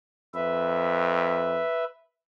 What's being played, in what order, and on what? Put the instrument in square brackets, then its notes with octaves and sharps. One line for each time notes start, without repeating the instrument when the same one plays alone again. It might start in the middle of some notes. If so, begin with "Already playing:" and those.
[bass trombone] F2 [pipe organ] B4 E5